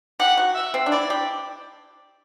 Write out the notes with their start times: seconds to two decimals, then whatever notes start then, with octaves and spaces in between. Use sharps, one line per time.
0.20 G4 F#5
0.37 F#4
0.55 E5
0.74 C4
0.86 D4
0.91 E4 D5
1.10 G4